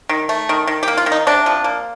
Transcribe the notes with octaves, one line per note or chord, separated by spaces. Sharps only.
D#3
A3
D#3
D#3
G4
A#3
F4
D#3
D#4
C3 D4
F3
A#3